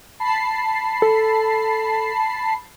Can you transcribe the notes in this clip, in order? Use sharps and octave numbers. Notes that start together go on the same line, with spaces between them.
A5 B5 C7
A4